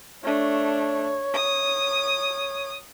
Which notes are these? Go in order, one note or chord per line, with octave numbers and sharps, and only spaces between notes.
A3 D4 C#5
D#6